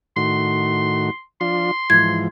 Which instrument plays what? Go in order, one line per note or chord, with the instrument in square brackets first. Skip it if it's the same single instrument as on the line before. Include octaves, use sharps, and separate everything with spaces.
[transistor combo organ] A2 D#3 F#4 [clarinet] C6
[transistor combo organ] F3 D4 F4 [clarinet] C6
[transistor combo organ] G#2 E3 F3 [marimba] G#6